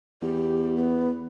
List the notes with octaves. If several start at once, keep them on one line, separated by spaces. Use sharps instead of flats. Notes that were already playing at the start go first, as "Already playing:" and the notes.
E2 G4
B3